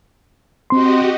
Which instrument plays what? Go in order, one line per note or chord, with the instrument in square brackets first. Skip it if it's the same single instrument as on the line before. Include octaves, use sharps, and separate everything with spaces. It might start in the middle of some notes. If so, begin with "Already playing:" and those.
[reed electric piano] C4 C6 [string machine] F#4 G4 D#5